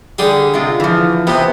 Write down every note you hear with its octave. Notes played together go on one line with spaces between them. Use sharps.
D3 G3 G4 G#4
C3 G#3 F4
E3 F3
C3 E3 B3